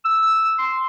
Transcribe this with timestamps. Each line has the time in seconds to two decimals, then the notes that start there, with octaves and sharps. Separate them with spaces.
0.05 E6
0.59 C6